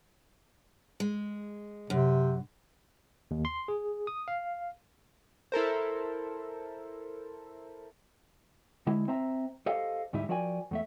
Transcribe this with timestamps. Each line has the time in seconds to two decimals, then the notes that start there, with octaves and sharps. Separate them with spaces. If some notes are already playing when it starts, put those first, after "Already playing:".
1.00 G#3
1.90 F#2 C3
3.31 D#2
3.45 C6
3.68 G#4
4.07 D#6
4.28 F5
5.52 E4 A4 A#4 C5
8.87 D3 G#3 E4
9.08 C4 C5 E5 A#5
9.66 G4 A4 C5 D#5 F5
10.13 D2 G#2 G3 D#4 E4 E5
10.29 F3 F#4 A#4 D5 G5 G#5
10.71 E2 A3 E5